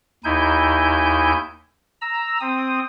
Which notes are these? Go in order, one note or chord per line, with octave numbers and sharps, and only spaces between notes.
D#2 D#4 E4 G#5 G6
A#5 E6
C4 D#6